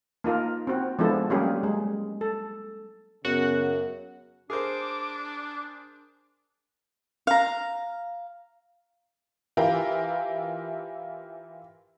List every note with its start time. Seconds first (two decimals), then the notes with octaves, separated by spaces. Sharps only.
0.24 A#3 D#4 F4 A#4
0.67 C4 F#4
0.99 F3 G#3 B3 D4 E4 A4
1.30 F#3 G3 A#3 C#4 G4 G#4
1.63 G#3
2.21 A4
3.25 F#2 C#3 B3 F#4 F#5
4.50 D4 G#4 A#4 C5 D6
7.27 F5 A#5
9.57 E3 E4 F4 G4 A#4